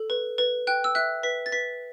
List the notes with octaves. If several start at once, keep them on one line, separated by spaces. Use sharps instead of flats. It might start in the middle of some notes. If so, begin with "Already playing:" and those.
Already playing: A4
B4
B4
G5 F#6
E6
E5 F#6
B4 B6
A6
B4 B6